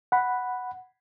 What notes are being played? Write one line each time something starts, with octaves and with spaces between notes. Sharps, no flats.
F#5 B5